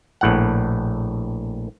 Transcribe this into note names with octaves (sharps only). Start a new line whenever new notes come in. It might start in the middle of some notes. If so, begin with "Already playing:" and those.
A#1 A2 F#5